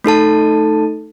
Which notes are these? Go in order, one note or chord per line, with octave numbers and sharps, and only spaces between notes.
A3 D#4 A4 A5